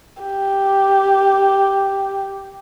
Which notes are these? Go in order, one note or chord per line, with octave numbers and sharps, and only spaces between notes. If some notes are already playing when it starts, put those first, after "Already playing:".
G4